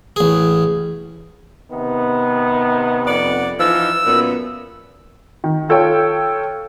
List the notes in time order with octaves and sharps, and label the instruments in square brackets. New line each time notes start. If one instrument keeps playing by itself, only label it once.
[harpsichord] A1 G#4
[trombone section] C3 D#3 B3
[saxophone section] F2 D5 F#5
[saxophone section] E3 F3 D#4 [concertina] E6
[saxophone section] F#2 A#2 B3
[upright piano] D#3
F4 A4 C#5 G5